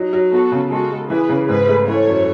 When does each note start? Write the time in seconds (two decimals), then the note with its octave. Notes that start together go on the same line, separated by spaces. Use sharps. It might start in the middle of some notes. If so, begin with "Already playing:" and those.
Already playing: F#3 D#4
0.13 F#3
0.32 B3 F#4 A4
0.52 C#3
0.71 G#3 F#4 A4
0.91 G#3
1.10 E3 G#4 B4
1.29 C#3
1.49 G#2 G#4 B4
1.68 A3
1.87 E3 A4 C#5
2.07 F#2